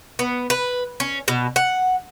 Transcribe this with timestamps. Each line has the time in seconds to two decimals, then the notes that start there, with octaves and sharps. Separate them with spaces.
0.19 B3
0.50 B4
1.00 C#4
1.28 B2
1.56 F#5